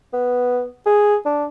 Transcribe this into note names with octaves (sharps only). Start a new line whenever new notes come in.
B3
G#4
D4